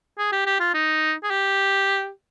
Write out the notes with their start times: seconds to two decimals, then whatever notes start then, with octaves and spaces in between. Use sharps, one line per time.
0.18 G#4
0.32 G4
0.46 G4
0.60 F4
0.74 D#4
1.24 G#4
1.30 G4